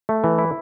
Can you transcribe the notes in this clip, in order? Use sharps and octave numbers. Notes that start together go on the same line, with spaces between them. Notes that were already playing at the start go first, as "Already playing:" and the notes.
A3
E3
E4